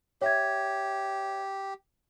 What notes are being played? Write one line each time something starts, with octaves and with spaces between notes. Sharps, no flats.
G4 C#5 E5 G#6